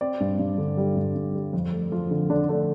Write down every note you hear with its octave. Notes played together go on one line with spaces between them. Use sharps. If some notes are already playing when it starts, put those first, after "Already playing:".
C4 D5
G2
G2
D3
G3
G2
G2
G3
F2
A3
F3 F4
D3
D3 D4
A3 D4